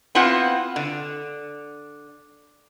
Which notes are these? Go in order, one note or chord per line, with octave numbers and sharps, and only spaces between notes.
B3 C4 E4 F4 F#5
D3